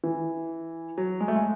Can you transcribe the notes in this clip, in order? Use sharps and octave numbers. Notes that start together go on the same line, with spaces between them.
E3
F#3
G#3
A3
G#3